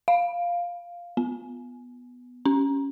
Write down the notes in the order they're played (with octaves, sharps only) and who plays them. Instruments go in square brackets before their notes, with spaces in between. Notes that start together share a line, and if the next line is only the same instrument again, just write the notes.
[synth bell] F5
B3
C#4